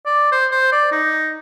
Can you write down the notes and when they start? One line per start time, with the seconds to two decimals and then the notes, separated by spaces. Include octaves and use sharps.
0.06 D5
0.32 C5
0.52 C5
0.72 D5
0.92 D#4